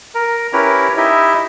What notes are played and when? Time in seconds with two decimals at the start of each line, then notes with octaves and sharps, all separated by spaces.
0.15 A#4
0.53 C#4 E4 G4 A#4 B4 C#5
0.97 D#4 E4 G4 D#5 E5